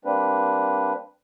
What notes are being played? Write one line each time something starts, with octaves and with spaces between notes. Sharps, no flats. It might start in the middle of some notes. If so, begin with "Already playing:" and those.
G3 A#3 C4 D4 B4